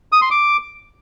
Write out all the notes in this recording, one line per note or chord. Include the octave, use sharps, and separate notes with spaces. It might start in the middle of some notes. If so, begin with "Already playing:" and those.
D#6
C6
D6